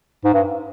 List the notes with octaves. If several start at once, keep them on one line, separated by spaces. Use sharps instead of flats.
G#2
G2